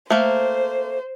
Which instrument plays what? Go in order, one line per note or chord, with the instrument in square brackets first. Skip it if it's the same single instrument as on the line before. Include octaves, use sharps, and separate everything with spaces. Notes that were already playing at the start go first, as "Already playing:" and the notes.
[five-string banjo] A3 A#3 [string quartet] C5